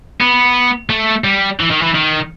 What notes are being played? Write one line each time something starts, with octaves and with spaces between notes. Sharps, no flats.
B3
A3
G3
E3
D#3
E3
D#3